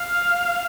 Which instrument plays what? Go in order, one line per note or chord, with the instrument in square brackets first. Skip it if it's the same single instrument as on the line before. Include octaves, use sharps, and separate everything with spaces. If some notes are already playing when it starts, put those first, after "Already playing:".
Already playing: [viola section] F5